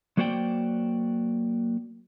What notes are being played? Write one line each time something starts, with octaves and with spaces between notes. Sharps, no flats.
F#3 A#3 F#4 C5 D5 G5